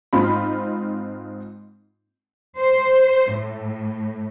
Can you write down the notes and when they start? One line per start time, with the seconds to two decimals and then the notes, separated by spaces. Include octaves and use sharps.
0.13 G#2 C4 D#4 F4 B5
2.60 C5
3.33 A2